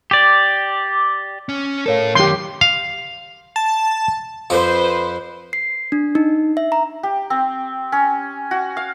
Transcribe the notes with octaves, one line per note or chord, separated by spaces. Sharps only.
G4 D5
C#4
A2 A4 A#4 C#5 F5
F#2 D#3 G4 C6
F5
A5
F2 F3 B4 C5 D6
C7
D4
D#4
E5
A#5
G4
C4
C#4
F#4
F5